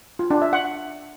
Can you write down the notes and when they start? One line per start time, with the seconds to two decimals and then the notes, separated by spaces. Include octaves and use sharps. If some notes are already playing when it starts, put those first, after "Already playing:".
0.19 F4
0.30 D4
0.42 E5
0.53 F#5